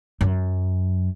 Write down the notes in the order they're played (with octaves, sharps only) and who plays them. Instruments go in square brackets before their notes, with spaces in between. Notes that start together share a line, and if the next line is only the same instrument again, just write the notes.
[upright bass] F#2